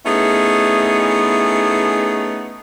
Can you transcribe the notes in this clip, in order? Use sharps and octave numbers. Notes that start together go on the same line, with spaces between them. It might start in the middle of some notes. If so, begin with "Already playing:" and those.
A3 B3 C#4 D#4 E4 G#4